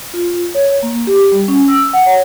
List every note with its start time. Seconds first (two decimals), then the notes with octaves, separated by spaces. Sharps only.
0.14 F4
0.55 C#5
0.83 A#3
1.07 G4
1.32 G3
1.48 C#4
1.68 E6
1.93 F#5
2.06 C#5